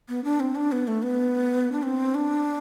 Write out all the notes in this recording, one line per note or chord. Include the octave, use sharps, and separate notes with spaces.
B3
D4
C4
D4
B3
A3
B3
D4
C4
D4